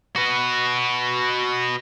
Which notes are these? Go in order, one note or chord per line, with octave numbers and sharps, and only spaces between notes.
F#4 B4